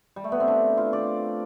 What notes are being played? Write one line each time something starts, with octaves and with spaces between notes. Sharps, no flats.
G3
A3
B3
C4
D4
F4
D5